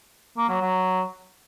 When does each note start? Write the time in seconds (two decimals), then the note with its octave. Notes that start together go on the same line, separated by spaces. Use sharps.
0.37 A#3
0.49 F#3
0.61 F#3